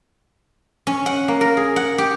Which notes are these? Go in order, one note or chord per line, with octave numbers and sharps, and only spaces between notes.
C#4
F#5
A#3
A#4
G#4
F#5
G4